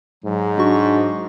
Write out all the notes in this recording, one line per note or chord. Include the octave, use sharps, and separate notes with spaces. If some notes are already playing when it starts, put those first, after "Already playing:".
G#2 F#3
F#3 D4 F#4 C#6